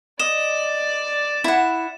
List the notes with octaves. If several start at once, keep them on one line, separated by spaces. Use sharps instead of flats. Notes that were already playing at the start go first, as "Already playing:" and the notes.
D5 D#5 E7
E4 F#5